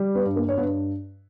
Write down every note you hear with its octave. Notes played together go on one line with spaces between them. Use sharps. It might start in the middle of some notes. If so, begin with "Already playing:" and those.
Already playing: G3
B3 B4
G2
A#3 A#4
C#5
G2 B3 B4